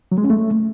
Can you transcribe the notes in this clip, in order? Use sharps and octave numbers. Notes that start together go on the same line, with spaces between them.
F#3
G#3
C#4
A3